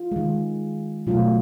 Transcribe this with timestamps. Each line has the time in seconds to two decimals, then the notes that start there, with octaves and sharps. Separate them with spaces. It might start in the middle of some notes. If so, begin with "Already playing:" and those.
Already playing: F4
0.12 D#3 G#3
1.07 B2 F#3 A3 F4